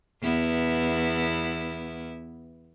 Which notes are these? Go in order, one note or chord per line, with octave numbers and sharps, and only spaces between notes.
E2 B3 E4